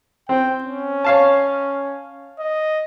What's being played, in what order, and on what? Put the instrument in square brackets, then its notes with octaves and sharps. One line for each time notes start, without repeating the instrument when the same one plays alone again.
[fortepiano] C4 [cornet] G5
[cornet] C#4
[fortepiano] C#5 F5 A5
[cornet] D#5